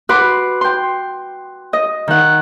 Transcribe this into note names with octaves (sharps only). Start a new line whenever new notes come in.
F#4 B4 F#5 C6 D6
G5 C6
D#5
D#3 F#5